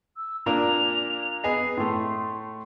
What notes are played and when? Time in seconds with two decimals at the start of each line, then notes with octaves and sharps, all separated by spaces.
0.17 E6
0.46 A#2 A#3 D4 F7
1.21 F7
1.44 B3 G#4 D#5 C7
1.77 A2 A3 C6